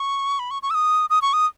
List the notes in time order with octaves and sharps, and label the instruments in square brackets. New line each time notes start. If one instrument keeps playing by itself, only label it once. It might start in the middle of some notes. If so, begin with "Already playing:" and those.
Already playing: [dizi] C#6
B5
C#6
C#6
E6
D#6
D#6
C#6
D#6